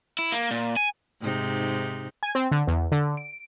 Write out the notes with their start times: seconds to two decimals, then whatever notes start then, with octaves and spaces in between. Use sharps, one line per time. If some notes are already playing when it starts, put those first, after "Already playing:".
0.19 E4
0.32 A#3
0.51 A#2
0.77 G#5
1.21 G#2 C3 D#4
2.23 G#5
2.35 C4
2.52 D3
2.67 E2
2.92 D3
3.17 D7